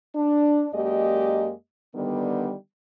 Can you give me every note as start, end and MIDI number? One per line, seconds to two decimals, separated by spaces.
0.15 0.67 62
0.74 1.52 42
0.74 1.52 56
0.74 1.52 58
0.74 1.52 67
0.74 1.52 74
0.74 1.52 75
1.95 2.53 50
1.95 2.53 51
1.95 2.53 55
1.95 2.53 59